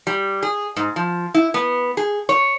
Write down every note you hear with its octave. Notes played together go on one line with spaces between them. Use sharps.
G3
G#4
G#2
F3
E4
B3
G#4
C#5